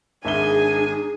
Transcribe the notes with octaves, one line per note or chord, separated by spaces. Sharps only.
G#1 D4 D#4 G#4 E5 G#5 G7